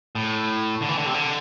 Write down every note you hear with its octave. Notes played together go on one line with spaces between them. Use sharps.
A2
D3
E3
D3
C3
D3